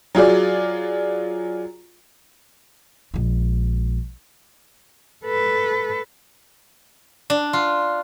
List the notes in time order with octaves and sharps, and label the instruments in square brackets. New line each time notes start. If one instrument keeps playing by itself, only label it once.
[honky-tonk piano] F#3 F4 G#4 D5
[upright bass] A#1 G#3
[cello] A4 B4
[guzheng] D4
F4